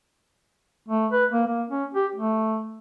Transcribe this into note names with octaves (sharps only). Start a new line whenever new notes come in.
A3
B4
A#3
A#3
C#4
G4
A3